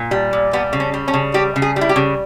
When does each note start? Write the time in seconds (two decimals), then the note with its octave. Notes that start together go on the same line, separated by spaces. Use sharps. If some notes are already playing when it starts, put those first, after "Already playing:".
Already playing: A#2
0.11 G3
0.33 A#2
0.53 G3 B3
0.73 C#3
0.80 C#4
0.94 G3
1.08 C#4
1.14 C#3
1.34 G3 G4
1.56 C#3
1.62 G#4
1.76 G3
1.81 E4
1.89 G4
1.96 C#3